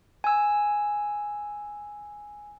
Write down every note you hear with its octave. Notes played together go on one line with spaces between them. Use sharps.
G#5 E6